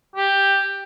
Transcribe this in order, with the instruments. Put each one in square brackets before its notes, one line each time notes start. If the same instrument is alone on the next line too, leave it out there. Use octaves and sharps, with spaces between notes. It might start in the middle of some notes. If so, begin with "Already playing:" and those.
[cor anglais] G4